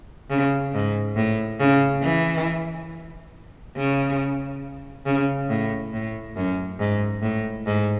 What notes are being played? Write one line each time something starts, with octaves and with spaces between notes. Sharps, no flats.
C#3
G#2
A2
C#3
E3
C#3
C#3
A2
A2
F#2
G#2
A2
G#2